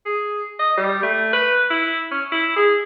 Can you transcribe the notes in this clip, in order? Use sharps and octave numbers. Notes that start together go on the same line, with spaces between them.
G#4
D#5
G3
A3
B4
E4
C#4
E4
G#4